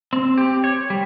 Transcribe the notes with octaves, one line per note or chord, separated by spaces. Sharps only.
C4
G4
C#5
G3